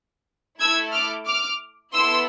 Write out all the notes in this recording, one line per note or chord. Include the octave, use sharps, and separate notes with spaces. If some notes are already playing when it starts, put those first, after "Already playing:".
A3 E4 A4 E6 G#6
D6 F6
D6 F6
B3 E4 A4 C6 E6